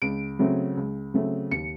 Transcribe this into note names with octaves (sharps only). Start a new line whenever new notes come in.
C#2 D7
C#3 F#3 A3 C4
C#2
C#3 F#3 A3 C4
D#2 C#7